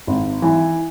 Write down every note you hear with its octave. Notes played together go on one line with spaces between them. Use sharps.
G#1
E3